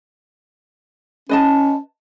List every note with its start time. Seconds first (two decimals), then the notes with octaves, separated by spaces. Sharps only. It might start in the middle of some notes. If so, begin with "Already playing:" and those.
1.29 C#4 B4 D#5 A5